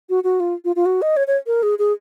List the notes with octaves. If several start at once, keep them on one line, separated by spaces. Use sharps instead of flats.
F#4
F#4
F4
F4
F4
F#4
D#5
C#5
C#5
A#4
G#4
G#4